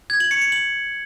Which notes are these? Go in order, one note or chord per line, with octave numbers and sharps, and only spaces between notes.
G#6
F#7
C#7
C#7
F#7